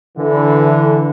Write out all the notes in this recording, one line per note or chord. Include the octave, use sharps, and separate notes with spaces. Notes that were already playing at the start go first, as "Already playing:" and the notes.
D3 E3